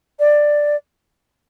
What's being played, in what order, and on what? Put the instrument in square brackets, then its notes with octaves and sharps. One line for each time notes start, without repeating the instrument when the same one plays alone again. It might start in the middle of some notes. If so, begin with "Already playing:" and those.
[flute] D5